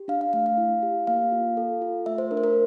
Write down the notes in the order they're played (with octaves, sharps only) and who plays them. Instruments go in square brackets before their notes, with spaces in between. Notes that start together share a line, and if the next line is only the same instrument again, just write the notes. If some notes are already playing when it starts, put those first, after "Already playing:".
Already playing: [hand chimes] G4
D4 F5
F5
A3 F5
F5
E4
G4
A#3 F5
F4
A4
F4
A3 E5
C5
D4 A#4
C5
A#4